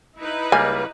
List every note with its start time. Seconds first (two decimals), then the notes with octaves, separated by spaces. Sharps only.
0.18 D#4 E4 B4
0.52 C#2 G3 A#3 G#5